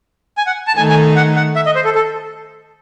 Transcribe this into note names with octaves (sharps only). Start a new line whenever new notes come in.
G#5
F#5
A5
D#3 A3 D#4 A4 G#5
G#5
F#5
F#5
E5
D#5
C5
A4
A4